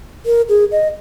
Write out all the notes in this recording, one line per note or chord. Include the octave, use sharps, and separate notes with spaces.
A#4
G#4
D#5